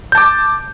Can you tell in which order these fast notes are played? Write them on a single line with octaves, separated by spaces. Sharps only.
G6 A5 D6